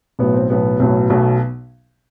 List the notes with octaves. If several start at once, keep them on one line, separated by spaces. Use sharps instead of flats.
B1 A2 F#3 B3
C4
B1 A2 F#3 B3
B1 A2 F#3
B1 B2 F#3 A3